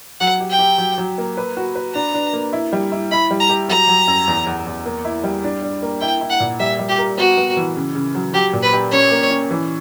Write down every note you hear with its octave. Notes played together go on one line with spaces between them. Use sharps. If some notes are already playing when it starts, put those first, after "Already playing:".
F#3 F#5
G4
G5
G4
F#3
F#3
A#3
B4
F#4
B4
D4 A#5
D4
A#3
E4
G3
E4
E4 B5
G3
A#5
G4
F#3 A#5
F#3
F#2
E2
E2
E2
A#3
E4
G3
D4
D4
A#3
E4 G5
E4
F#5
A#2
G3 E5
G3
G4
A#4
B3 F#4
B3
E3
C#3
C#3
F#3
F#3 G4
A#2
B4
G4
C#4 C#5
A#3
C#4
E3